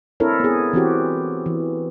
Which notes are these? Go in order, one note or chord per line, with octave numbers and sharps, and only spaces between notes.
C4 D4 E4 A4 A#4 C#5
B3 G#4
E3 C4 F#4 G4
E3